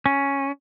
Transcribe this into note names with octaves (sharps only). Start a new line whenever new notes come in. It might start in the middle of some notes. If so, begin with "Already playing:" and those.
C#4